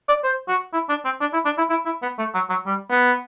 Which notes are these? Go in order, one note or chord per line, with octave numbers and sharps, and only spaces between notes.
D5
C5
F#4
E4
D4
C4
D4
E4
D4
E4
E4
E4
B3
A3
F#3
F#3
G3
B3